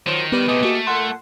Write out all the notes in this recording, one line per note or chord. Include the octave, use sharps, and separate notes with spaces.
D#3 F3 F#3
G3 B3 B4
C3 A3 G4 G#4 D#5
A3 A#3 F#4
A#2 A4 F#5 C6